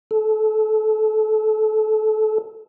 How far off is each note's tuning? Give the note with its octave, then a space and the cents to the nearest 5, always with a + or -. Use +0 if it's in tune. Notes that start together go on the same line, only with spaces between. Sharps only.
A4 -25